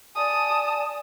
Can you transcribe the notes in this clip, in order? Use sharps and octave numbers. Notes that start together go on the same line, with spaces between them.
D5 G#5 A5 D#6